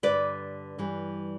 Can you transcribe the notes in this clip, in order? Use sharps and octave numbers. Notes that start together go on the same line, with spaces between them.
G2 D3 G3 B4 D5
G2 E3 G3